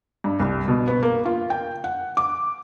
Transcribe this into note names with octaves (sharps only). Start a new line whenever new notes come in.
G2
C2
B2
B3
A#3
F4
G5
F#5
D6